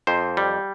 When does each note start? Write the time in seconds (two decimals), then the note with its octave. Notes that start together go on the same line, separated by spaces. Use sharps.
0.07 F2 C5
0.37 G3